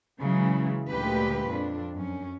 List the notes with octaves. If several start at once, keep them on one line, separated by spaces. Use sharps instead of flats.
C#3 E3 F#3 G#3
D2 A#2 G#3 G4 B4
F2 D4
F#2 C#4